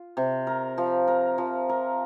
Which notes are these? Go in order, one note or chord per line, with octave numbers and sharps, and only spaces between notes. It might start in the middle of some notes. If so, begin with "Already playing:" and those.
Already playing: F4
C3
A#4
F3
A#4
F3
A#4